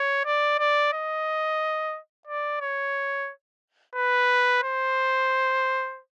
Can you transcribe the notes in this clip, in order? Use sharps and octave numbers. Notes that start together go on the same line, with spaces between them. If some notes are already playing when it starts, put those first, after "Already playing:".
Already playing: C#5
D5
D5
D#5
D5
C#5
B4
C5